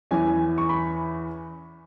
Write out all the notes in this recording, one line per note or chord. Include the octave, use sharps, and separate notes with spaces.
E2 E3 C#4 G#5
C#6
B5